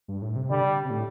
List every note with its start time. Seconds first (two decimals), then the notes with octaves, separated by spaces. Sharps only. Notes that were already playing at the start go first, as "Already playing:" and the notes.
0.08 G2
0.22 A2
0.36 C3
0.50 D3 G3
0.85 C3
0.90 A2